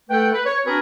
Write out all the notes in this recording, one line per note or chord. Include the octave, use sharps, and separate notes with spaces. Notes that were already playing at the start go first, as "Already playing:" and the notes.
A3 A4 B4 F#5 G5
B4
C#5
C4 D4 F#4 G#4 A#4 B4